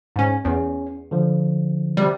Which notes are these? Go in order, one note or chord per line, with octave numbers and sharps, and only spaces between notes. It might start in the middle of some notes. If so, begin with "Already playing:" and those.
G#2 C#4
E2 C#4
D3 F3
C3 G3